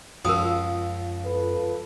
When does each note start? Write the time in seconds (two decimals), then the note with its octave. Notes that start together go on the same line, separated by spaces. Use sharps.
0.25 C#2 F#2 F3 A#4 D#6
1.25 F4 A4 B4